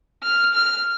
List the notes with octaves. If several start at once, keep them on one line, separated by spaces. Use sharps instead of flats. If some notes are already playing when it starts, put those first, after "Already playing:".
F6
F6